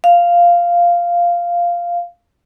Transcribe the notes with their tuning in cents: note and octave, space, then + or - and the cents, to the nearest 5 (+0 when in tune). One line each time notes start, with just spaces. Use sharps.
F5 -5